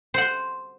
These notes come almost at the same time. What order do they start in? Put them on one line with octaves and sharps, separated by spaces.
C5 F#5 C6